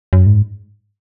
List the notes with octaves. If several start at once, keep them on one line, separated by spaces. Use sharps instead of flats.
F#2
G#2